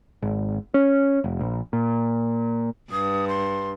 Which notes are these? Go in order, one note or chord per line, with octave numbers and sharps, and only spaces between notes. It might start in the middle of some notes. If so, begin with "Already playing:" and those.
G#1
C#4
F1
A#1
A#2
G2 D#6
C6